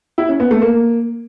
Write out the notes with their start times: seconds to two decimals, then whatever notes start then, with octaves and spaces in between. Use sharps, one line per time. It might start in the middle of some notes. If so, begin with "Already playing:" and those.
0.18 E4
0.29 C#4
0.40 B3
0.51 A3
0.62 A#3